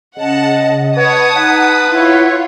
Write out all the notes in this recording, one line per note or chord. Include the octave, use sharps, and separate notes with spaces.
C#3 D#5 F#5 A5
B4 C#5 F#5 A5 D#6
D#4 B4 F#5
E4 F4 C#5